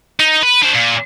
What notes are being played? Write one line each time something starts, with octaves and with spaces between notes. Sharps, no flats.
D#4
B4
D4 C5
A#2